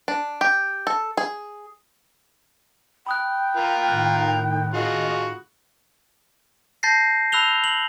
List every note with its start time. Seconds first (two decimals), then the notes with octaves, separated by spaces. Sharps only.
0.08 D4
0.41 G4
0.87 A4
1.17 G#4
3.06 G5 B5 D#6 F#6
3.57 F4 A#4
3.89 A2 D#3 F#6
4.74 F4 F#4 G#4 D#5
6.83 A5 G6 A6 A#6 C7
7.32 A5 B5 E6 F#6 F7 G7
7.64 F#7